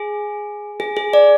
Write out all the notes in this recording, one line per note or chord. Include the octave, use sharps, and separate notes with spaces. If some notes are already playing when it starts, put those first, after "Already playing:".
Already playing: G#4
G#4
G#4
D5